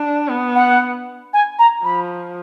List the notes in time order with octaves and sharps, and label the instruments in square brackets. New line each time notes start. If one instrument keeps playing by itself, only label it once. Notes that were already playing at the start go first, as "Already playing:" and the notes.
Already playing: [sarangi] D4
B3
[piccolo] F#5
G#5
A#5
[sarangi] F3 [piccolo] B5